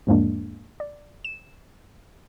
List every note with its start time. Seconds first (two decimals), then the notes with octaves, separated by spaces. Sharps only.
0.07 E2 G#2 F3 G#3 A#3 D4
0.80 D5
1.25 E7